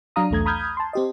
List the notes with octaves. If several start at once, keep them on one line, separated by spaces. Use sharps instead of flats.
F#3 D4 F5 A#5 D#6
B1 E2 A3 A#5 G#6
A#5 B5 D#6 F6 G6 G#6
A5 C6
C4 G4 D#5